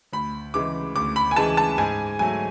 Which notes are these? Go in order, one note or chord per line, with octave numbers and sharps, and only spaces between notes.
D2 B5
C#3 E3 G#3 D6
D2 D6
B5
G#5
C#3 E3 G#3 A5
A5
G#2 G#5
F#3 A3 G#5